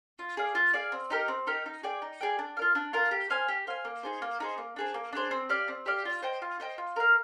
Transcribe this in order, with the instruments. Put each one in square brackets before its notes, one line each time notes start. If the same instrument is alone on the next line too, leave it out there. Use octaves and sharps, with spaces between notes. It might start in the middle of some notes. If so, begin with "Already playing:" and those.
[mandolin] F4
G#4 D5 F5
F4
G#4 D5 F5
C4
D#4 G4 A#4
C4
D#4 G4 A#4
D#4
G#4 D5 G5
D#4
G#4 D5 G5
D4
F4 A#4 F5
D4
F4 A#4 F5
G4
C5 F5 G#5
G4
C5 F5 G#5
A#3
D#4 G#4 C5
A#3
D#4 G#4 C5
A#3
D4 G#4 C5
A#3
D4 G#4 C5
C4
G4 D5 F5
C4
G4 D5 F5
F4
C5 D#5 G5
F4
C5 D#5 G5
F4
A#4 F5